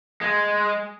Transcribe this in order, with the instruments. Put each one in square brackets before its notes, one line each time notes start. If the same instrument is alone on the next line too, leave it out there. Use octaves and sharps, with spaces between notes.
[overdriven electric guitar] G#3